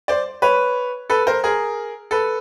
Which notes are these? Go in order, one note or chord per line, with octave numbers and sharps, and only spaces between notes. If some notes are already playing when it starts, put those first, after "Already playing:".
C5 D5
B4 C#5
A4 B4
A#4 C5
G#4 A#4
A4 B4